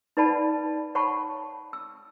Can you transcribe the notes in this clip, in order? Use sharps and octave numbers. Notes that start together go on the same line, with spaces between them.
D#4 B4 D5 F#5 A5 B5
C#5 F#5 A5 B5 C#6
E6